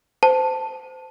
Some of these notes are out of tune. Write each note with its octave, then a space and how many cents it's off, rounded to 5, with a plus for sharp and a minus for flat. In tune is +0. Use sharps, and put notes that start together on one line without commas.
C5 -25 A5 +0